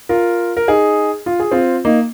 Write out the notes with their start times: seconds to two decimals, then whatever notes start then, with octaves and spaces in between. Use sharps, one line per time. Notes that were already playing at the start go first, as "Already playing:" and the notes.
0.09 F4 A#4
0.57 A#4
0.68 D#4 G#4
1.26 F4
1.40 G#4
1.51 C4 F4
1.85 A#3 D#4